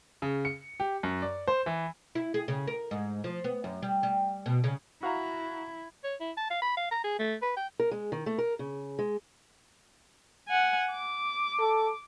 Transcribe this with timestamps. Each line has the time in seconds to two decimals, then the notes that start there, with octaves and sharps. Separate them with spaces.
0.22 C#3
0.45 C#7
0.80 G4
1.03 F#2
1.22 D5
1.48 C5
1.66 E3
2.15 E4
2.34 G#4
2.48 C#3
2.67 A#4
2.91 G#2
3.24 F3
3.44 B3
3.64 F#2
3.82 G3
4.03 G3
4.46 B2
4.64 C#3
5.03 E4 F#4 F5 A#5
6.04 C#5
6.21 E4
6.37 A5
6.50 F5
6.62 B5
6.77 F5
6.91 A#5
7.04 G#4
7.19 A3
7.42 B4
7.56 G5
7.79 A#4
7.91 G#3
8.12 D#3
8.26 A3
8.38 A#4
8.59 C#3
8.99 G#3
10.48 F#5 G#5
10.91 D6
11.59 A4